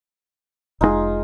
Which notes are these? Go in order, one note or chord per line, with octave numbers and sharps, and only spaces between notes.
F1 C3 G#3 D#4 F4 G#4